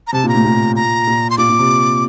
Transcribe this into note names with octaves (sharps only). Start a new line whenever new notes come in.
A#5
C3 A5
A#2
A#5
A2
A#2
A#5
A#2
C6
A#2 D6
A#2
C3